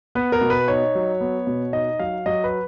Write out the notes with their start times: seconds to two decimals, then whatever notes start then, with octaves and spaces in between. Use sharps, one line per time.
0.15 B3 B4
0.32 A#4
0.41 B2
0.50 B4
0.68 D#4 C#5
0.95 F#3
1.21 B3
1.47 B2
1.73 D#4 D#5
1.99 F#3 F5
2.26 F#3 D#5
2.44 B4